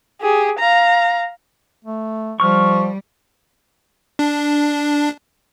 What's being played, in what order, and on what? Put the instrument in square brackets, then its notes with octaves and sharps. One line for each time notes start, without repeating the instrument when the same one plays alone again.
[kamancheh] G4 G#4
F5 A#5
[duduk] A3
[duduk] F3 [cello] G3 [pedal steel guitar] C#6 F6
[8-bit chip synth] D4